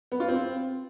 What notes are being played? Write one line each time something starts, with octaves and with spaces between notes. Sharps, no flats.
B3
F4
C4